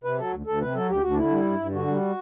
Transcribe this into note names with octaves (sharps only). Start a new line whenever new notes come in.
C3 B4
F#3 A4
D2
D2 A4
C3 B4
F#3 A4
D2 G4
D2 F#4
D4
D3 E4
G3
G2
G2
D3 F#4
G3